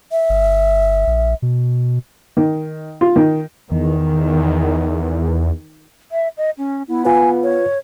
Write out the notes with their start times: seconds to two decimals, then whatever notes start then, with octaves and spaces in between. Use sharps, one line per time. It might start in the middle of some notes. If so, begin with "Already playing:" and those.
0.12 E5
0.29 G1
1.07 A#1
1.42 B2
2.37 D#3
3.01 F4
3.16 D#3
3.71 E2 D#3
6.12 E5
6.38 D#5
6.58 C#4
6.88 B3 E4
7.05 F4 B4 G#5
7.43 C#5